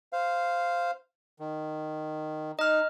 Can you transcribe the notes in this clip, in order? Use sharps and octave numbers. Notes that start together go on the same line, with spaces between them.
C5 F5
D#3
D#4 D#5 F6